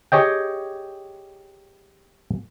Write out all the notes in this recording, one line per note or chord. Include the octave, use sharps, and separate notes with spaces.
G4 G#4 C#5 D#5 G5